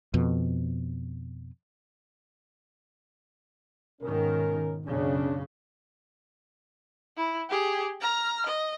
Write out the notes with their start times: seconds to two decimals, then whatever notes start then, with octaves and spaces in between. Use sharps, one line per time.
0.14 F2 B2
4.01 G#2 B2 D#3 C#4 A#4
4.86 B1 F#2 C#3 C#4 D4
7.17 E4
7.50 G4 G#4
8.01 A#5 F6
8.47 D#5